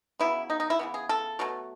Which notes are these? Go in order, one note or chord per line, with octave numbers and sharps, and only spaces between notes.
C#3 F#3 B3 E4
D#4
D#4
E4
C#3 E3 B3
G#4
A4
B2 F#3 A3